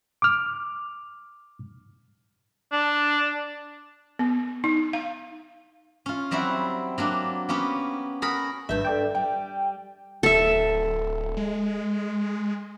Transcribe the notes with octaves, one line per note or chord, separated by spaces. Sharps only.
D6 F6
D4
B3
D#4
F5
C#4 F4
F#3 G3 C4 E4 F#4
F#3 A#3 D4
A#3 B3 C#4 G4
F#4 G#4 A#4 B5
G#1 G2 E5 G6
A4 D5 G5
G3 G5
D1 A4 E5
G#3